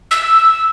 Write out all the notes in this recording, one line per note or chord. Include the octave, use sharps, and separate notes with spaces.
E6